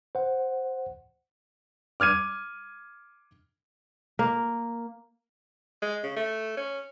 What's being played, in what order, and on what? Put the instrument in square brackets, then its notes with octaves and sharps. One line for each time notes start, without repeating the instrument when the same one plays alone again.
[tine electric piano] C5 F#5
[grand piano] D6 F6 G#6 D#7
[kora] A#3
[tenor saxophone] G#3
C#3
A3
C#4